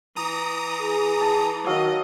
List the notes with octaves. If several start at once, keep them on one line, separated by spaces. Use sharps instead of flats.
E3 A#5 D#6
G#4
A5
D#3 F#3 D#5 F5